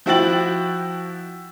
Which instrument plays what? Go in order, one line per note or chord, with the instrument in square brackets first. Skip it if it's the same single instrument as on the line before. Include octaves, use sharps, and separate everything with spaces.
[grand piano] F3 E4 F#4 G5 A6 F#7